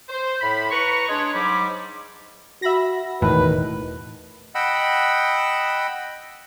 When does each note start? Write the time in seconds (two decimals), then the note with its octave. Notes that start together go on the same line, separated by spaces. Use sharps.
0.09 C5
0.41 A2 B5
0.71 B4 A#5 C#6
1.09 G#3 D4 G#4 C#5 C6
1.33 G#2 F#3 G3 B5 D6
2.62 F#4 E5 B5 A#6
3.22 E1 E2 A2 D#3 B4
4.55 D#5 F#5 G5 B5 E6